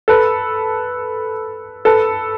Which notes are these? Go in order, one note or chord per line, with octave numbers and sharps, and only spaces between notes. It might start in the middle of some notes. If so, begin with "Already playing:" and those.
A4 B4
A4 B4